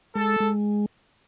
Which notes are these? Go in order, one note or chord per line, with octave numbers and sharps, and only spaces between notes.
G#3 A4
G#3